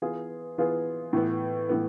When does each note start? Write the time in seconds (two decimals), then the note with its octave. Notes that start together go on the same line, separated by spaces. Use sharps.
0.02 E3 B3 F4 G#4
0.58 E3 B3 F4 G#4
1.13 A2 E3 B3
1.69 A2 E3 B3